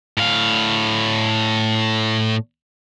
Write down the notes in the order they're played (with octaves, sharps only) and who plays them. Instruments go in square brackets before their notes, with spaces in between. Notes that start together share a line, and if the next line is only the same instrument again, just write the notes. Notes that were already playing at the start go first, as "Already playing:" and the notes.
[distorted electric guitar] A2 F5